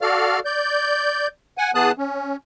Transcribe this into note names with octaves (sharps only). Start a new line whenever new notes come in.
F#4 A4 D5 F5 F6
D5 G6
F#5 G#5
E3 B3 G#4 A5 D#6 F#6
C#4